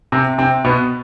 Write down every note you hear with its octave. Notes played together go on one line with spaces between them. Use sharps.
C3 C4
C3 C4
B2 B3